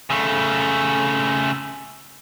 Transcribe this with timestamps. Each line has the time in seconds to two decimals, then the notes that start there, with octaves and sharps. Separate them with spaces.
0.10 C#3 A3